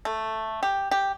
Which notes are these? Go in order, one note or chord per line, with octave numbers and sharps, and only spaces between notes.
A3
G4
G4